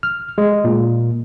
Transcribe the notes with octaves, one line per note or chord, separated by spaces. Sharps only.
F6
G#3
A#2